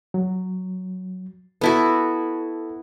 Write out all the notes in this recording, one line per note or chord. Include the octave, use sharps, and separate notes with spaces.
F#3
B3 E4 F#4 A4 A5